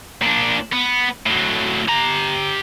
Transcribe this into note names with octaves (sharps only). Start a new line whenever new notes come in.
A#2 D4
B3
A2 F#3
G4 A#5